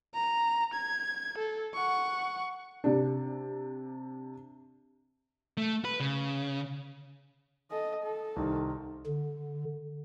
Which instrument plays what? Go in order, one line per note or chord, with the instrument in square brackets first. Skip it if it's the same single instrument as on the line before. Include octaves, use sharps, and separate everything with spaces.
[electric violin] A#5
G#6
A4
F#5 C#6
[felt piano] C3 D4
[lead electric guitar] A3
B4
C#3
[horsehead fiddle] A4 D#5
A4
[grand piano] C2 D#3
[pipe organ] D3